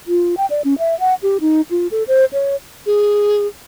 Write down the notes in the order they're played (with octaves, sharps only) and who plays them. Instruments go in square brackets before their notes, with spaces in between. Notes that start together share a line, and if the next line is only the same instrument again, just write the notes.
[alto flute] F4
G5
D5
C#4
E5
F#5
G4
D#4
F4
A4
C5
C#5
[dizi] G#4